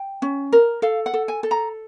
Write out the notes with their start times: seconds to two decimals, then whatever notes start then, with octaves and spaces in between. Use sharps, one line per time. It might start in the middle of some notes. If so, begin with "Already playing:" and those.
Already playing: G5
0.22 C#4
0.52 A#4
0.82 A4 F5
1.06 F#5
1.14 A4
1.28 G#5
1.43 A4
1.51 A#5